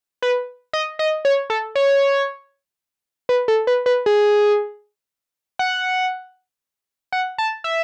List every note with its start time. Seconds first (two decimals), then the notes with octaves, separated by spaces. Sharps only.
0.22 B4
0.73 D#5
0.99 D#5
1.25 C#5
1.50 A4
1.75 C#5
3.29 B4
3.48 A4
3.67 B4
3.86 B4
4.06 G#4
5.59 F#5
7.12 F#5
7.38 A5
7.64 E5